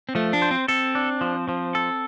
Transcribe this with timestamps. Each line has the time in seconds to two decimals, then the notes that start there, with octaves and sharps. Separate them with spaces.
0.09 C4
0.15 F3 A3
0.33 D4
0.42 C5
0.51 C4
0.68 C4 A4
0.95 D4
1.21 F3
1.49 F3
1.75 A4